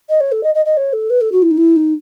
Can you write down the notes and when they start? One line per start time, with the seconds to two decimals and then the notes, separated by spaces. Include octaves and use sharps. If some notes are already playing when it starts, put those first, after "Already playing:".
0.09 D#5
0.20 C#5
0.32 A4
0.43 D#5
0.55 D#5
0.66 D#5
0.77 C#5
0.93 A4
1.10 B4
1.21 A4
1.32 F#4
1.42 E4
1.51 D#4
1.57 E4
1.76 D#4